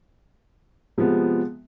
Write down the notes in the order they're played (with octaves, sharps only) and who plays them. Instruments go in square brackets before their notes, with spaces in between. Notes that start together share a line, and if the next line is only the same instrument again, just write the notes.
[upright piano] C3 F3 G#3 B3